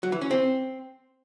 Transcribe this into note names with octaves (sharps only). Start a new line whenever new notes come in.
F#3
E3
C#4
C4